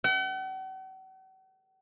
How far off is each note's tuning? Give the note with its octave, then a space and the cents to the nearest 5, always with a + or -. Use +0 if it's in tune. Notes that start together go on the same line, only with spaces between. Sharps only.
F#5 +45